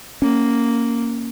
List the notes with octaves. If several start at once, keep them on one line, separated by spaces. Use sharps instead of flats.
A#3 C#4